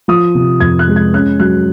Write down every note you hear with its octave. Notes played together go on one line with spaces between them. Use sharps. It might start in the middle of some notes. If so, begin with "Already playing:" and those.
F3 D#6
C3
F2 G#6
F#6
G#3
G#6
C#4 F#6
F#3 F#6